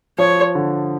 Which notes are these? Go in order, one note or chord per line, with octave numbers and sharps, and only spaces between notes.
F3 C#5
D3